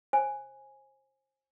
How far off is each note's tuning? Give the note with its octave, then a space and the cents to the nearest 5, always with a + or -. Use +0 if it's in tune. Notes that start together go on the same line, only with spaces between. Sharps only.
C5 +30 G#5 +0